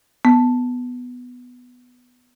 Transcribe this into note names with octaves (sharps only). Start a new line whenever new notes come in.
B3